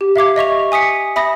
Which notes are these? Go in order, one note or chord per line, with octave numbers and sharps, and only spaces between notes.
G4
E5 F5 D6 G#6
D#5 E5 C#6 F7
G#5 D#6 B6 C#7
E5 B5 D#6 A#6